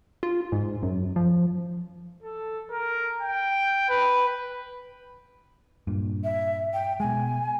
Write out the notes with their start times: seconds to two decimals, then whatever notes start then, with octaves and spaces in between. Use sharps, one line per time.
0.23 F4
0.52 G#2
0.83 F#2
1.16 F3
2.23 A4
2.71 A#4
3.22 G5
3.89 B4
5.87 G2 A#2
6.24 E5
6.73 G5
7.00 B2 G#3 G#5